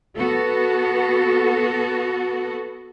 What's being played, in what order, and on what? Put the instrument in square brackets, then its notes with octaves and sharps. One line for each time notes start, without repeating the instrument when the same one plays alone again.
[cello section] B3 F#4 A4